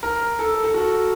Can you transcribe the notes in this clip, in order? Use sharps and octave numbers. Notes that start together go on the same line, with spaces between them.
A#4
A4
A4
F#4